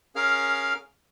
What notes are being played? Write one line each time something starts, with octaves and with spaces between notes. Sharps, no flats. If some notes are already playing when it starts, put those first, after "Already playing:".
C#4 G#4 A#4 F5 F6